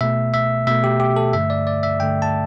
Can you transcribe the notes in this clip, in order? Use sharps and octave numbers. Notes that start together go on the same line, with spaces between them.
B2 A3 E5
E5
B2 A3 E5
G4
G4
A4
G2 D3 A3 E5
D5
D5
E5
G2 D3 A3 G5
A5